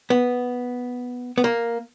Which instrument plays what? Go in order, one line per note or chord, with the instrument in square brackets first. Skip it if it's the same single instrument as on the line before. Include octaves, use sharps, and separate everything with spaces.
[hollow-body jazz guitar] B3
B3
A#3